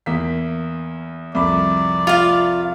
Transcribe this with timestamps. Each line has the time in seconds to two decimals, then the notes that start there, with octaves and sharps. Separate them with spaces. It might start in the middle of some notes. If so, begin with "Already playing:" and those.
0.06 E2 A#3 B6
1.35 C2 F2 D5 B5
2.07 F4 F5